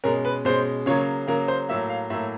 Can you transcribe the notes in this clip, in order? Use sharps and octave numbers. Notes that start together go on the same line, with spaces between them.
B2 G#3 C#4 A#4
B4
B2 G#3 C#4 C5
C#3 F#3 A#3 C#5
C#3 F#3 A#3 A#4
C5
A2 F#3 A#3 E5
F5
A2 F#3 A#3 E5